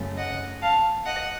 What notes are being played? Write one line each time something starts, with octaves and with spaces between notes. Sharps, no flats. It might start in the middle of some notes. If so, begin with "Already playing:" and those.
Already playing: F#2 C#3 A3
D#5 F#5
F5 A5
D#5 F#5